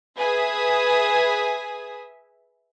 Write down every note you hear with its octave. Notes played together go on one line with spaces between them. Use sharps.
G#4 B4 E5 G#5 D#6